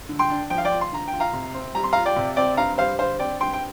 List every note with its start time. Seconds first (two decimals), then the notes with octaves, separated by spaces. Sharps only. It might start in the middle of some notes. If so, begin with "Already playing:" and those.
0.09 D3
0.19 G5 C6
0.30 D4
0.50 F3 G5
0.58 F5
0.65 D5 G5
0.71 F4
0.81 C6
0.92 D3 A#5
1.08 G5
1.13 F4
1.20 F5 A#5
1.33 C3
1.54 C4
1.75 G3 A#5
1.84 C6
1.93 F4 F5 A#5
2.06 D5 G5
2.16 C3
2.36 C4 D5 G5
2.57 G2 F5 A#5
2.78 G3 C5 F5
2.99 D3 C5 F5
3.19 C4 D5 G5
3.40 G2 G5 C6
3.53 G5